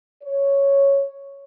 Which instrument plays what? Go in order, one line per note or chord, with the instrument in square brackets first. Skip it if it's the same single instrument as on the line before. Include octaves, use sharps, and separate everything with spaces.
[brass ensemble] C#5